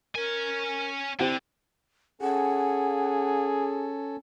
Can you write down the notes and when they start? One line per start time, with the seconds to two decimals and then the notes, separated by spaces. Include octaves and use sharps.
0.15 C#4 A#4 G#5
1.19 D3 C4 E4 G4
2.21 C#4 G#4 A4 F#5